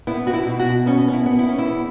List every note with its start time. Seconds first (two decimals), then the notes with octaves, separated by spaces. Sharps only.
0.07 B3 E4
0.27 F#4
0.33 E4
0.47 B2
0.59 F#4
0.86 B3 C#4
1.08 C#4
1.13 E4
1.26 B3
1.39 E4
1.49 C#4
1.58 E4
1.65 E2